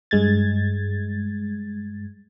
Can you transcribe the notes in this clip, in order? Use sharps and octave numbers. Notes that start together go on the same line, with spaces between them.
G2 G#3 G#6 A6